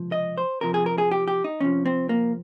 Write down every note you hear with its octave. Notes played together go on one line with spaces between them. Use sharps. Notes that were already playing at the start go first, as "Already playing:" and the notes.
Already playing: C#2 C3 F3
D#5
C5
F2 C3 F3 A#4
G#4
A#4
G#4
G4
G4
D#4
F2 C3 F3 C#4
C4
A#3